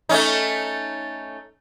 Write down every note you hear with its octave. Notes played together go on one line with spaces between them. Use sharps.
A3 C#4 D#4